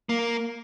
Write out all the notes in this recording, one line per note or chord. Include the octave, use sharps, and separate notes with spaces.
A#3